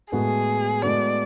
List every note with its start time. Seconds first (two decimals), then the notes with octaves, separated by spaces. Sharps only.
0.12 A2 G#3 B3 F#4 G#4 A4
0.82 A2 G#3 B3 F#4 A4 D5